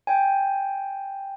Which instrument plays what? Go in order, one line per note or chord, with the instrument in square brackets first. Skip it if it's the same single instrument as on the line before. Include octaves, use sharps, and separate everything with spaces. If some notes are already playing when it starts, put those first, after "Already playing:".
[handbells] G5 G#5